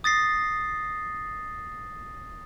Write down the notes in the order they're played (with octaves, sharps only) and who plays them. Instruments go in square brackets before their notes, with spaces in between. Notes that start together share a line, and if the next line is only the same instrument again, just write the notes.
[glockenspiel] D#6 A6 A#6 C7